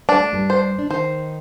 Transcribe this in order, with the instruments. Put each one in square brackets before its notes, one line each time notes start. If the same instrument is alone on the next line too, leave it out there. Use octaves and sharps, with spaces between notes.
[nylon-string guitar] G3 [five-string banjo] D4
[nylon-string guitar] A3
G2 G3
[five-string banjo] C5
[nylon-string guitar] D4
[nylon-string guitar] D#3 D#4 [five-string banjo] C5